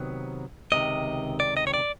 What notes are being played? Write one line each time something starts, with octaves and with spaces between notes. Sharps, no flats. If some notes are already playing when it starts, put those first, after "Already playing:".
Already playing: C3 D#3 F#3 B3
C#2 C3 D#3 D#5
D5
D#5
C#5
D5